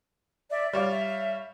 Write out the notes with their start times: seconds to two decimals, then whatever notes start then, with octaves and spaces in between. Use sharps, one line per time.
0.50 D5 E5
0.73 G3 C#5 D5 F5
0.91 E5